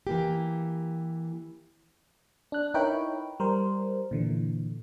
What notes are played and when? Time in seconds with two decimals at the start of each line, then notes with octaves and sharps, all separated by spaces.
0.07 E3 A#3 G4
2.52 D4 F#6
2.74 D#4 E4 A#4 B4 C#5 G5
3.40 G3 A#4 C5
4.11 A#2 D3 E3